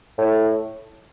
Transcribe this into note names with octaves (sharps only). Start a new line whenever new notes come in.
A2